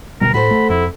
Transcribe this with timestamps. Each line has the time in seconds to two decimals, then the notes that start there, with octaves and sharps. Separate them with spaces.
0.21 D2 B2 G3 A#4
0.34 A2 F#4 A4 C5 B5
0.51 A3
0.70 F2 E4